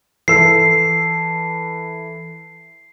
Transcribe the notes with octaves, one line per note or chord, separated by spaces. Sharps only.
E3 A4 E6 C7